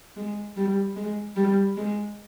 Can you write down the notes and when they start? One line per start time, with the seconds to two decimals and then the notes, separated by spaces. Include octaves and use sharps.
0.16 G#3
0.57 G3
0.96 G#3
1.36 G3
1.77 G#3